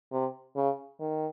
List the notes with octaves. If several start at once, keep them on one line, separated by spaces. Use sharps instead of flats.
C3
C#3
D#3